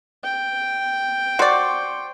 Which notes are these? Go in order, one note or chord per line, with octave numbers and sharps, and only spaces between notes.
G5
F#4 C5 D5 C6 C#6